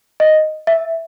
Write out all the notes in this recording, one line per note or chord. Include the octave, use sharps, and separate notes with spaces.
D#5
E5